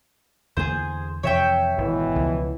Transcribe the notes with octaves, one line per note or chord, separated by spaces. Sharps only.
E2 D3 A#3 G#4 C5
F2 C3 E3 C#5 E5 G5
G#1 B2 E3
C#2 F3